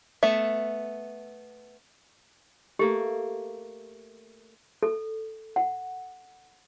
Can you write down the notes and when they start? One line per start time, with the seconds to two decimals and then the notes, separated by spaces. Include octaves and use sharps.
0.23 A3 B3 E5
2.79 A3 A#3 G4
4.83 A4
5.56 F#5